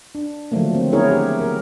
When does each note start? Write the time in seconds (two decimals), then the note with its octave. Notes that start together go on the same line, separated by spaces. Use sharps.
0.15 D4
0.52 D3 D#3 F3 F#3 A3 A#3
0.75 C4
0.92 B3 C#4 E4 G#4 A#4 C#5
1.11 G4
1.40 A#4